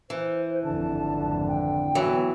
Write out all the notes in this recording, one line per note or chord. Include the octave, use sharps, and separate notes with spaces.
E3 C5
G#1 F2 D3 A5
G5
E3 F#3 B3